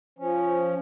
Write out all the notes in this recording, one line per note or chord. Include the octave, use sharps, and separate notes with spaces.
F3 C#4